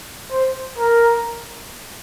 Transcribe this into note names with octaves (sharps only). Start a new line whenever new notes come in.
C5
A#4